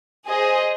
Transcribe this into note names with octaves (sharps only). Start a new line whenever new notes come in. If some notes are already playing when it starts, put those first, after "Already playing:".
G#4 C5 D#5